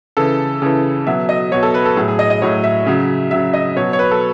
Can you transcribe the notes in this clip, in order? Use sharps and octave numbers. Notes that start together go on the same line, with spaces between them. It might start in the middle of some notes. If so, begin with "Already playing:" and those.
C#3 E3 A4
C#3 E3
B2 F#3 E5
D#5
B2 F#3 C#5
A4
B4
A4
A2 F#3 G#4
G#4
D#5
D#5
A2 F#3 C#5
E5
C#3 F#3
C#3 F#3 E5
D#5
B2 F#3 C#5
C#5
B4
A4